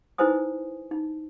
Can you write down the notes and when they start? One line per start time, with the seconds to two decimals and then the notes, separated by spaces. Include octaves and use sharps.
0.18 D#4 E4 B4 C5 G#5 D#6
0.91 D#4